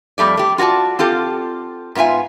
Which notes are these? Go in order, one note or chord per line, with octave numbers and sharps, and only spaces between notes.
F2 G3 A3 D5
A3 G4
F4 F#4 A#4 D5 A5
C4 F4 G4 A4
G#2 B3 F4 E5 G#5